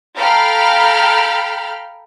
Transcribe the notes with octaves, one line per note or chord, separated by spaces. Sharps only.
A4 F5 G5 A#5 B5 F6